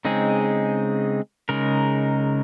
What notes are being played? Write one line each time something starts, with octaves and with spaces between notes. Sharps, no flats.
C#3 G#3 C4 D#4 G#4
C#3 G#3 D#4 A#4